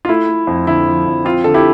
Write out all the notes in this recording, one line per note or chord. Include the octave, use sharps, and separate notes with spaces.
F4
A3 E4
A3
F2
D3 E4
F3
F2
C4 F4
D3 A4
E4 G4